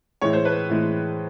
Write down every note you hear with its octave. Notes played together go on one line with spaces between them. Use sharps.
A2 E3 G#3 C#5
C5
B4
A2 E3 G#3